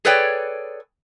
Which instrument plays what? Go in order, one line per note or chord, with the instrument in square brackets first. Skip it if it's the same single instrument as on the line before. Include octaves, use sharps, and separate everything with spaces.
[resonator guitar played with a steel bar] G#4 A4 B4 C#5 D5 G5